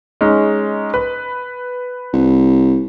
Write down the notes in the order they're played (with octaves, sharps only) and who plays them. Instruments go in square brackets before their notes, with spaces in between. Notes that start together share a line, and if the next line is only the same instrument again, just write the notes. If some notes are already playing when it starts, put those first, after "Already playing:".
[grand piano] G#3 C#4 D#4
B4
[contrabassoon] C2